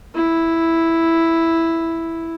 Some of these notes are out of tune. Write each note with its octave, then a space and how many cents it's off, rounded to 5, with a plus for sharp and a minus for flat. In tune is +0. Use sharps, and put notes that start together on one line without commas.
E4 +0